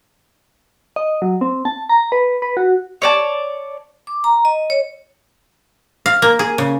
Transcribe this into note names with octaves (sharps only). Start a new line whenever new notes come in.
D#5
F#3
C4
A5
A#5
B4
B4
F#4
C#5 D5 A5
D6
A#5
D#5
C#5
F5
A#3
G#4
C#3